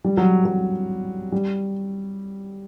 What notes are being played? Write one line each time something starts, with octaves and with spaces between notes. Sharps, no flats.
G3
F#3
F#3
G3